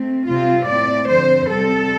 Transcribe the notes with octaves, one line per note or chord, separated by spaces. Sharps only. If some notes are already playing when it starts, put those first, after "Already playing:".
Already playing: A3 C4
C3 G3 C4 F4
A2 A3 C4 D5
D3 F3 C4 C5
C3 G3 C4 A4